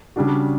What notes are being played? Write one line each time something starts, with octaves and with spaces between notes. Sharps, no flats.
C#3 G3 D4 F#4